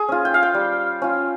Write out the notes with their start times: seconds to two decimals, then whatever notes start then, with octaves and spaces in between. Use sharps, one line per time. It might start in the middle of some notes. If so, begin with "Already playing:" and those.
Already playing: G#4
0.09 C#4 F4
0.25 G5
0.34 F5
0.43 G5
0.54 G3
1.02 C#4 F4